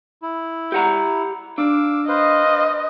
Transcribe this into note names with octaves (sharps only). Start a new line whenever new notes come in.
E4
G4 F#5 A#5
D4 F5 D6 E6
B4 C5 D#5 F5